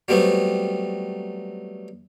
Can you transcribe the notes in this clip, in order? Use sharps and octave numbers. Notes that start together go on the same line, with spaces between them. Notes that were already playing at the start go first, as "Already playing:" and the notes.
F#3 G3 A3 B3 C4